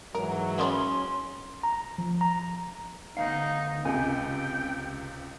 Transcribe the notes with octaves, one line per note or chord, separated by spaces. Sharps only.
G#2 E3 F#3 A#4
A#3 C#4 D5 B5 C6
A#5
F3
A#5
D2 B3 D#4 F5
C#2 C3 G5 G#5